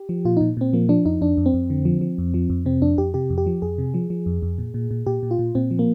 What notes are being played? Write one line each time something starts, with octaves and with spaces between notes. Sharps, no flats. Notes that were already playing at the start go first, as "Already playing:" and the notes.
Already playing: G4
F3
A#2 F4
A#2 D#4
A#2 C4
F3 A#3
F3 D4
F2 D#4
F2 D4
F2
C4
F2
D3
F3
F3
F2
F3
F2
C3 C4
F2 D4
F2 G4
C3 G4
F2
G4
F3
F2 G#4
C3
F3
F3
F2
F2
A#2
A#2
A#2
A#2 G4
A#2
F4
A#2
A#2 C4
F3
A#3